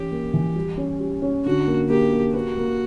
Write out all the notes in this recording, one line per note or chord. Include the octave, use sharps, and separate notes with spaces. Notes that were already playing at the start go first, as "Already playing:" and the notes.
Already playing: E3 C#4 G4
A#3
E3
G3
C#4
G3
C#4
D3 F#4
A#3
A#3 G4
A#3
F#4 B4
A#3